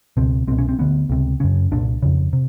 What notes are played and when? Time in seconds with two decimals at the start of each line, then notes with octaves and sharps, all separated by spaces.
0.17 C#2 B2 C4
0.48 C2 B2 C4
0.58 C#4
0.69 C4
0.79 D2 D3 B3
1.10 C#2 C3
1.40 F#2 C#3 C#4
1.71 C2 A#2 D4
2.02 F2 C#3
2.33 C3